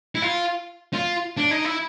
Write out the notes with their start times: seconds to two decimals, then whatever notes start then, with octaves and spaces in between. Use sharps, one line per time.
0.15 E4
0.22 F4
0.93 F4
1.37 D4
1.51 D#4
1.65 E4